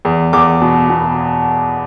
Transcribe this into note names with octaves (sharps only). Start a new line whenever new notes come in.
E2
E2 D6
B2
B2